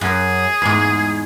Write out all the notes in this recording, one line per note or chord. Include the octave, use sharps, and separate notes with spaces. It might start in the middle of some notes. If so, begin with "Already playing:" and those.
F#2 G#4
E2 G#2